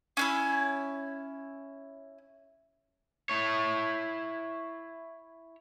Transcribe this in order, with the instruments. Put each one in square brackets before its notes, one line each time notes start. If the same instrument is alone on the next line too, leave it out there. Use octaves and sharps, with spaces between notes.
[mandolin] C#4 D4 E4
[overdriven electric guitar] E4 C#5